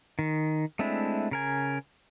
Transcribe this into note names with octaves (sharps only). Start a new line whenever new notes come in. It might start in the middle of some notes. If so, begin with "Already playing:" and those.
D#3
G#3 A3 C4 D4 E4
C#3 A#4 G#5